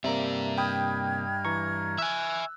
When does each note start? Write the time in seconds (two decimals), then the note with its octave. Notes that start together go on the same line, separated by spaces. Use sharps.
0.04 G2 C3 A#3 D5 E5 A#5
0.58 D#5 G5 B5 D#6 F6 G#6
1.45 E3 A#5 C#6
1.98 E5 G#5 E6 F#6